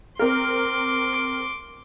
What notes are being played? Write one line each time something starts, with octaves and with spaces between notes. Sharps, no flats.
C4 A#4 C6 D6